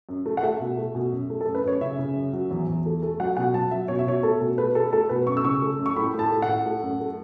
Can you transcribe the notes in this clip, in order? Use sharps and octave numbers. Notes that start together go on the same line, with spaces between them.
F#2
A3
F#5
A3 E5
B2
A3
B2
F#2
A3
A4
F#2
B4
F#2 C#5
C#3 E5
C#3
F#2
F#3
E2
E2
A3
A3
F#3 F#5
B2 F#5
F#3 A5
F#3 E5
B2 C#5
E5
B2 C#5
A3 A4
B2
A3 B4
A3 A4
A3 A4
B2 B4
F#2 C#6
E6
C#3 C#6
A3
F#2
C#6
A2 B5
A2
A5
A3
F#5
A2
A3
F#2
A3